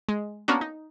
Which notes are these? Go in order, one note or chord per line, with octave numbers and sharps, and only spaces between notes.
G#3
A#3 B3 C#4 D4 F#4
D#4